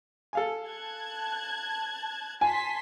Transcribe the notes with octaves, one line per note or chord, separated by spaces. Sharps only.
A4 F5 G#5
A5 F#6 G#6
G#5 A5 C6 B6